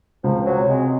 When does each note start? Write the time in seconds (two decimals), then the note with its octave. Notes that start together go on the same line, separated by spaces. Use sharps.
0.24 C#2 F3
0.46 F#3
0.58 C3
0.69 G#3